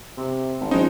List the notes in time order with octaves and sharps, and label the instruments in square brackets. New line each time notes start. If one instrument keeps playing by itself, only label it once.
[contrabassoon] C3
G#1
[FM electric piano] F3 C5 [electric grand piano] G#3 D#4 [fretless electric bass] C#4